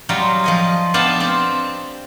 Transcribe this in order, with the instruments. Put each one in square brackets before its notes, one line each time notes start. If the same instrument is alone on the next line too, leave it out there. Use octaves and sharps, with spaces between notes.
[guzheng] F#3 G3 D#4 F4 A#5
F3 D#5 G#5
B3 D4 G4 F5 A5
C4 G4